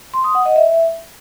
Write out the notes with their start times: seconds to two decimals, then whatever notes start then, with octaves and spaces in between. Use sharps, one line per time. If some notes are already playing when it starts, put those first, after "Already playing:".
0.14 C6
0.24 D#6
0.35 F#5
0.45 D#5
0.56 E5